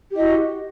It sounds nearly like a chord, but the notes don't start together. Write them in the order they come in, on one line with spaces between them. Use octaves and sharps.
G4 E4 D#5 F#4